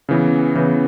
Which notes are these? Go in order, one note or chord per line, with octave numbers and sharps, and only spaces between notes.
C#3 E3 B3
C#3 E3 B3